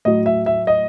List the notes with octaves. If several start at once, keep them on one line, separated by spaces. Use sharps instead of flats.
A2 F#3 D#5
E5
E5
D#5